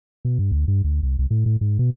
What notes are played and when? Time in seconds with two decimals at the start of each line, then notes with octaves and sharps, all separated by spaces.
0.25 B2
0.39 G2
0.52 D2
0.68 G2
0.84 D2
1.03 C2
1.19 C2
1.31 A2
1.46 A2
1.61 G#2
1.79 B2